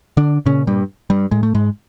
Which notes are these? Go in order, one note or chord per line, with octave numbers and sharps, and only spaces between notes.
D3 D4
A#2 C#3 C#4
G2 G3
G2 G3
A2 G#3
A3
G#2 G#3